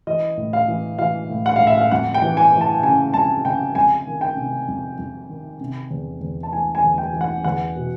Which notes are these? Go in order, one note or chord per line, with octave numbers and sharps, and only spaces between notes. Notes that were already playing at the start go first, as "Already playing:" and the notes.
E3 D#5
A2
F5
E3
E3 F5
A2
F#5
A2 F5
E5
F5
F2 F#5
G5
E3
G#5
E3
A5
C#3 G#5
F2 A5
C#3 G5
F2 G#5
D#3
G5
C3
F2
F2
D#3
C3
E2
E2
A5
E3 G#5
G#5
E2
G5
E3
F#5
E2 F#5
B2